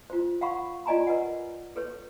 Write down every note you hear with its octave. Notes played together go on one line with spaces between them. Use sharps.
F4 C5
F5 F#5 B5 C#6
F4 D5 D#5 G#5 A#5 B5
A#4 B4 D#5 F#5
A4 B4 C#5